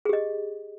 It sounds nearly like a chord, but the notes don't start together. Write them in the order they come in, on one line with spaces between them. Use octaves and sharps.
G#4 G4 D#5